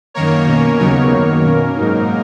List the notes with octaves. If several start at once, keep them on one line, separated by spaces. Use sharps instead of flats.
F#2 D#3 A#3 A#4 C#5
B2 A#3 C#4
D#2 C#3 F#3 B3 D#4 A#4 C#5
F#2 D#3 F#3 A#3
B2 A#3 C#4 A#4
G#2 F#3 A#3 D#4